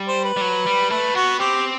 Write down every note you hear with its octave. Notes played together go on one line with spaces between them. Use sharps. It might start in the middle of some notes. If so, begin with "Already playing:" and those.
Already playing: G3
C5
B4
G3
F#3
G3
A3 B4
B3 F#4
C4 G4